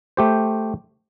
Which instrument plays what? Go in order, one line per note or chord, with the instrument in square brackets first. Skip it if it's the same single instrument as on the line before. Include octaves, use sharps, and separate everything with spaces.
[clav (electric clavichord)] A3 G4 C5